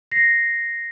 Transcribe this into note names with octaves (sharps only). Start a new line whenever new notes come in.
A#6 C7